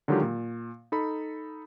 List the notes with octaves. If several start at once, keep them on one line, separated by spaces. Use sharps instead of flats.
D3 D#3 F#3 G#3 F4 G4
A#2
D#4 A4 B5